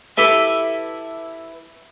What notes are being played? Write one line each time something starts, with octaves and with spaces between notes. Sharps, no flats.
E4 G4 A4 B4 E5